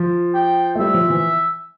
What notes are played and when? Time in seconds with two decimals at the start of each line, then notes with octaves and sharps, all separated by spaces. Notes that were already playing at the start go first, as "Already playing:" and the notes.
Already playing: F3
0.35 G5
0.75 A3
0.79 G3 E5
0.94 F3
1.10 E3